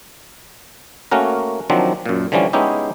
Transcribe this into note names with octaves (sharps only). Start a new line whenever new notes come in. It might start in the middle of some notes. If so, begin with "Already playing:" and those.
A3 A#3 C#4 F#4 A#4
D#3 F3 F#3 C4 D4
F#2 A#2
D3 E3 F3 G3 C#4
G#3 B3 C#4 D#4 E4 G4